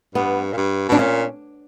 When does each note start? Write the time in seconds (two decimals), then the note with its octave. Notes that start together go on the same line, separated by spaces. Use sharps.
0.15 G2 B3
0.52 A#2
0.57 G2
0.89 B2 D4
0.99 A#2 C#4